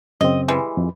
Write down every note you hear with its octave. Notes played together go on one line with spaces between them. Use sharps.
F#2 C#3 C4 D#5
E3 G3 G#3
F2